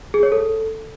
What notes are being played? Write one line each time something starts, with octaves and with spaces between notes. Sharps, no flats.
G#4
C#5
A4